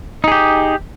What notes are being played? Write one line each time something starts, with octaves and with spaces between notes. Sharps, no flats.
D#4 G4 G#4